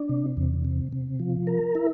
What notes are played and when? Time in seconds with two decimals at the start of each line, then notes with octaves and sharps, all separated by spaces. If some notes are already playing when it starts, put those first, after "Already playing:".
Already playing: D4
0.09 C3
0.37 E2
0.65 C3
0.92 C3
1.19 F3
1.47 A#4
1.75 E4